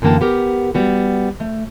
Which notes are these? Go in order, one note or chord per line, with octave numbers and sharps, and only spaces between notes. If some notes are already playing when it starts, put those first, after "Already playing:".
F#2 D3 E3 A#3 G5 A5
B3 G4 A#4
G3 B3 F#4
A3